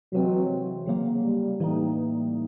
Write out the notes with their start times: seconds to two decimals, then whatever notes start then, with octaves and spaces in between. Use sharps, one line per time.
0.13 C3 E3 F#3 G#3 C4
0.86 C#3 F#3 A#3
1.23 G3
1.60 A2 E3 G3 A#3 D#4